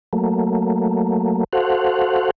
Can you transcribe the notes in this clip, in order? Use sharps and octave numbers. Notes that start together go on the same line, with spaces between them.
F#3 A3 A#3
F#4 A4 C5 F5 F#5